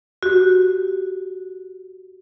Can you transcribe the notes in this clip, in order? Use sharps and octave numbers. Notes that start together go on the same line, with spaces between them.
F#4 G4